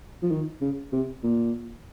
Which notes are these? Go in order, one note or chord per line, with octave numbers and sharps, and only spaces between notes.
F3
D#3
C#3
C3
A#2